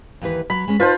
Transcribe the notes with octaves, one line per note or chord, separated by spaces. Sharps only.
D#2 E3 B4
F#3 B5
G#3 C#4
D#4 F4 B4 C5 A5